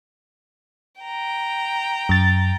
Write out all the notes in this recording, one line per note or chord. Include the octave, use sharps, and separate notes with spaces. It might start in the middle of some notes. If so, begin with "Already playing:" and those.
G5 A#5
F#2 A6